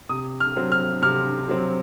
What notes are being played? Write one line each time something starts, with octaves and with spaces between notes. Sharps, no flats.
C3 D#6
F6
F#3 C4
F6
C3 F6
F#3 C4